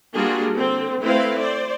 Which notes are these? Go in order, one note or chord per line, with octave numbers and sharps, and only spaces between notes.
G3 A#3 D4 F4 F#4 G#4
D3 C4
A3 C4 E4 B4 F5
C5 D5